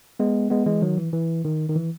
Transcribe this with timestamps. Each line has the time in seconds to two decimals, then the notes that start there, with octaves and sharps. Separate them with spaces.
0.19 G#3 B3
0.50 G#3 B3
0.66 E3 G#3
0.82 D#3 F#3
0.98 E3
1.13 E3
1.45 D#3
1.69 D#3
1.75 E3